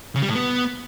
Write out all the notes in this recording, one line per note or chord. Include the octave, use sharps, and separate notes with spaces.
C#3
G3
A2
B3